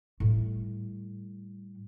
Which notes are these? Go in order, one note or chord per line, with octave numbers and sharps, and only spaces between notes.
A2 G3